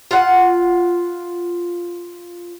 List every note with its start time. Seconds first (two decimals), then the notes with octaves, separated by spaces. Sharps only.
0.11 F4 F#5